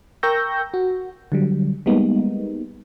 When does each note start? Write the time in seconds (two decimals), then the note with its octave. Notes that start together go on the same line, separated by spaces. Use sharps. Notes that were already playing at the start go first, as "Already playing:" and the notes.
0.23 A#4 G5 C#6 E6 G6 A#6
0.74 F#4
1.32 D3 F#3 G3
1.86 G3 G#3 A#3 B3 D#4